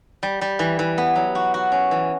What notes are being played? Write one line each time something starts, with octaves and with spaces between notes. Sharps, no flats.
G3
G3
E3
E3
B3
F#3
F#4
F#4
C#4
E3